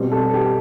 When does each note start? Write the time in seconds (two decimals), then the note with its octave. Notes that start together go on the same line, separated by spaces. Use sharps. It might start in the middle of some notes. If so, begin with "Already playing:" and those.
Already playing: B2 G3 C4
0.12 A4
0.34 G4